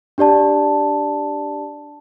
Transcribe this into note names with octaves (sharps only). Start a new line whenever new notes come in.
D4 G4 D5 A5